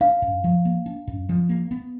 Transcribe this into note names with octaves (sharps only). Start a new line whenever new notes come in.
D4 F5
F#2
F3
A#3
D4
F#2
F3
A#3
B3